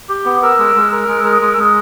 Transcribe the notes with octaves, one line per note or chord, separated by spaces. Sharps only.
G4
B3
A#4 E6
G#3
G#3
A#4
G#3
E6
A#4
D#6
G#3 D#6
E6
G#3
D#6